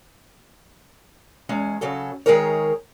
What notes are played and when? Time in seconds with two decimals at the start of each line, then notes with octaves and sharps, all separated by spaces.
1.49 E2 G#3 C#4
1.81 C#3 F#3 C#4 A4
2.26 D#3 F3 G#3 G#4 A#4 C#5